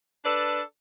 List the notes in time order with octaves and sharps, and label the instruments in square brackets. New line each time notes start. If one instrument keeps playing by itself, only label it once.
[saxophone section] D4 A4 B4 D5